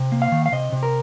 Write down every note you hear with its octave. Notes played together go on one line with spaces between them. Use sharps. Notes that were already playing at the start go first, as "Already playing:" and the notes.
Already playing: C3
A#3
F5
D#3
F5
C3 D#5
C3
A#4